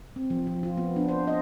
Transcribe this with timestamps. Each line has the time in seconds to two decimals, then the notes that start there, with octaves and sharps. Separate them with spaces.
0.16 C4
0.30 F3
0.47 F3
0.63 F4
0.77 B3
0.96 D4
1.08 C5
1.27 D#5